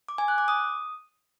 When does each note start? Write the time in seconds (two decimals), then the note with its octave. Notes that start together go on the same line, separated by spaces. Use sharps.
0.09 D6
0.18 G#5
0.28 F#6
0.38 D6
0.48 D#6